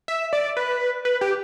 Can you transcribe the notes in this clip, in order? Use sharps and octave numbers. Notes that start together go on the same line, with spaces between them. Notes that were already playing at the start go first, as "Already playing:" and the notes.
E5
D5
B4
B4
G4